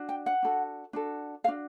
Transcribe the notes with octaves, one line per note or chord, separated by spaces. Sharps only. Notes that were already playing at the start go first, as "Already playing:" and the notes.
Already playing: D4 F#4
G5
F#5
D4 F#4 A4
D4 F#4 A4
A4 F5
D4 F#4